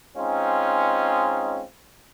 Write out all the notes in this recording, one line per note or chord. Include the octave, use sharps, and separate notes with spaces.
G#3 C4 C#4 D#4 F4